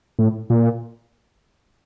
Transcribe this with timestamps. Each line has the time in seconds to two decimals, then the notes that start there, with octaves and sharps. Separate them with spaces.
0.19 A2
0.50 A#2